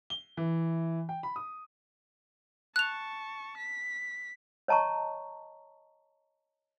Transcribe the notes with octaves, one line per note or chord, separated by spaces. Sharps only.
G7
E3
G5
B5
D#6
A5 C#6 F#6 F7
B6
C#5 D#5 A5 A#5 C#6